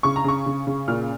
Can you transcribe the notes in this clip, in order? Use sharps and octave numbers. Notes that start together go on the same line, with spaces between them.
C#3 C#6
A#5
C#3 C#6
C#3
C#3
A#2 F6